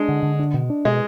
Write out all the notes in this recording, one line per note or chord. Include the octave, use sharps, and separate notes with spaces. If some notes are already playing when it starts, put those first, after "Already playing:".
Already playing: G#3 D4
D3
D3
D4
B2
D4
B2 G#3